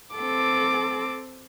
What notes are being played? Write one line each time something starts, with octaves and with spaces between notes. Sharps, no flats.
C4 A4 D6